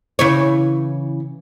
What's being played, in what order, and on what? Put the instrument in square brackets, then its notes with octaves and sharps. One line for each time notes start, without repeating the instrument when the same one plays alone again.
[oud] C#3 E3 C#5